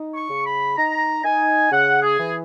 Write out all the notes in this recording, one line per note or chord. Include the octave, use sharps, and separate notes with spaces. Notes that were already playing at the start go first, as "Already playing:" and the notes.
Already playing: D#4
C#6
C#3
B5
D#4 A#5
D#4 G#5
C#3 F#5
G#4
E3